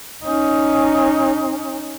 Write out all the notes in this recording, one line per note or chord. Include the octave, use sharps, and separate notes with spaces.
C#4 D#4